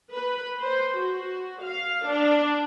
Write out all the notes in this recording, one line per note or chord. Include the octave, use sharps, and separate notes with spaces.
B4
C5
F#4
F5
D4